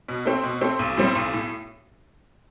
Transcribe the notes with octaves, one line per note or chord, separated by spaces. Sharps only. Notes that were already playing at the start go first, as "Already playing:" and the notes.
B2
A3 C4
B2
A3 C4
B1
A2 G3 C4
B1
A2